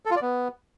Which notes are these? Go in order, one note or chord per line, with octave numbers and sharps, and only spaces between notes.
A4
F4
D5
B3